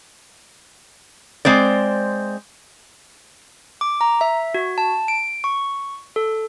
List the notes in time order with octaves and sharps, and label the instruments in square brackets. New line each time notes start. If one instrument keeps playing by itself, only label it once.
[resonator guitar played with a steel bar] G#3 C4 C5 D5
[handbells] D6
A#5
E5
F#4
A5
D7
C#6
A4